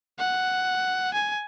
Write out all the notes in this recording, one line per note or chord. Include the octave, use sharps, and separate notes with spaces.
F#5
G#5